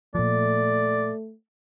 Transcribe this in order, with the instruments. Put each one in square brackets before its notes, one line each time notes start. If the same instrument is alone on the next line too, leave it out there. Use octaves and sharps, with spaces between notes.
[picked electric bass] A#2 F3 [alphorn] A3 [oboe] D5